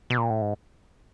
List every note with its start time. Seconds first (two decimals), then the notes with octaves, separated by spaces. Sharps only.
0.10 B2
0.18 A#2
0.30 A2
0.41 G#2